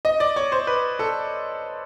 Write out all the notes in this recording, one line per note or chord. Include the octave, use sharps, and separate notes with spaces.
D#5
D5
C#5
C5
B4
A4